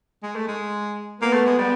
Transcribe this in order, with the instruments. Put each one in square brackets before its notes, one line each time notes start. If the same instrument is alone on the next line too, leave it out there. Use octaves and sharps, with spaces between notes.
[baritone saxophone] G#3
A3
G#3
[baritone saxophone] A#3 [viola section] B3
[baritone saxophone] A3
G#3
G3